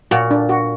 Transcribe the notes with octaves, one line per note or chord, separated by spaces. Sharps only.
A#2 F#4
D4
F#4